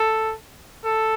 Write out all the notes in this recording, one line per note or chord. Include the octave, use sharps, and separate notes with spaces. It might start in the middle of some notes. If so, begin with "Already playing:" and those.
Already playing: A4
A4